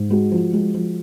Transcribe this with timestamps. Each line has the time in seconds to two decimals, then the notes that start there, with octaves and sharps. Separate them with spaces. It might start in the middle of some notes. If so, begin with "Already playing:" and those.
Already playing: G#2
0.10 G#3 F#4
0.32 F3
0.53 G#3
0.74 F3